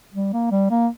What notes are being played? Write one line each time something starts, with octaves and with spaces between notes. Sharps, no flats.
G3
A#3
G3
A#3